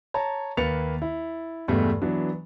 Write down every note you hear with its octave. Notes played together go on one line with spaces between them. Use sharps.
C#5 A5 A#5
D#2 A#3 B4 A6 C#7 F7
E4
E2 G2 B2 G#3 A3
E3 F#3 B3 D4